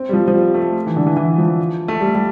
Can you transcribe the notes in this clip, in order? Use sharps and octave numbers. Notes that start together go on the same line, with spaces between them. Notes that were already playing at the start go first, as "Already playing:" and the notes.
Already playing: C4
G3
F3
F3
G3
A3
E3
D3
E3
E3
F3
A3
G3
G3